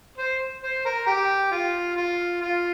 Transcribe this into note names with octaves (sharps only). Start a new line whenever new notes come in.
C5
C5
A#4
G4
F4
F4
F4